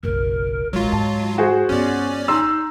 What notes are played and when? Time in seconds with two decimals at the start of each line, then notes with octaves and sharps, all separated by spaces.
0.03 F#1 B1 A#4
0.73 D#1 A1 F#3 G#3 F4
0.92 G#2 A5
1.38 F#4 G#4 C5
1.69 G1 B3 C#4 F4 D5
2.28 D#4 A#5 C6 E6